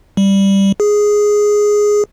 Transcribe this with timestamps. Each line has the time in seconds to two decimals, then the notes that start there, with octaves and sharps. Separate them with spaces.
0.17 G3
0.80 G#4